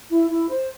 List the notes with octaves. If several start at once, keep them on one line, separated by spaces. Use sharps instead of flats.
E4
E4
C5